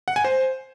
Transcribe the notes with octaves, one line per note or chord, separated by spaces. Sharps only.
F#5
G#5
C5